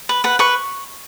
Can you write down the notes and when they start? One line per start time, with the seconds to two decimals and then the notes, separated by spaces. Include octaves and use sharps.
0.09 B4
0.24 B4 F#5
0.39 B4 C#6